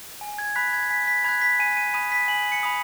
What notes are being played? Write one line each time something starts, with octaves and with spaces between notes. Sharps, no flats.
G#5
G#6
B5 F#6 B6
G#6
G#5 B6
B6
B5 F#6 G#6
B6
G#5 D#7
D#7
B5 D#6 D#7
B6
G#5 F#7
C#7
B5 D#6